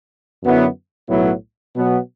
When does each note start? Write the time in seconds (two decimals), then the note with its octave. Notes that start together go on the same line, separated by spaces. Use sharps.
0.42 F#2 D3 F#3 B3 E4
1.09 B1 A2 F#3 B3 E4
1.75 B2 F#3 B3